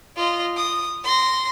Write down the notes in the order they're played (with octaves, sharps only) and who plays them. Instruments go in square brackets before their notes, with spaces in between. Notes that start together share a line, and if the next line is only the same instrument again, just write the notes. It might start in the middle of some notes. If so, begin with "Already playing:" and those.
[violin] F4 D#5
D#6
C6 A#6